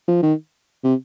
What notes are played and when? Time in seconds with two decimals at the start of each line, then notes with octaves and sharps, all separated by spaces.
0.08 F3
0.23 D#3
0.84 C3